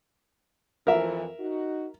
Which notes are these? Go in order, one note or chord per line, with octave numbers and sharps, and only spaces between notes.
F2 E3 F3 A#4 E5
D#4 F#4